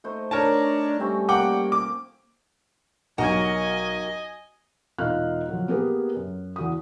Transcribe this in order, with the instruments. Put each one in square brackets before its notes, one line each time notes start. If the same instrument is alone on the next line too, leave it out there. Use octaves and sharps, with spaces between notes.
[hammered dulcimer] A3 D#4 C5
[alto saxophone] D4 [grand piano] A#4 C#5 A5
[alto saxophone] G3 [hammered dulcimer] A3 C4 C#4
[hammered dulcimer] A#3 [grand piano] F#5 G5 D6
[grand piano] D6
[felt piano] B1 F#3 [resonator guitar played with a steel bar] F#4 A#4 [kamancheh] D#5 G#5
[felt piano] E1 D#4 F4 F5 F6 F#6
F3 F#3
A#3 B3 G4 G#4 A#4 B4
F#2
E2 F#4 D#6